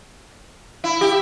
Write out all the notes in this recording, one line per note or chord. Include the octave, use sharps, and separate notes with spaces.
E4
G4